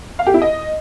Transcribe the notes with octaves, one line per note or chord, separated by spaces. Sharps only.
F5
G4
E4
D#5